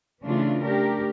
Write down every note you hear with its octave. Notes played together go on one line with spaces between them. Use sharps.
C#3 E3 A3 D4 F4
A3 D4 G4 A#4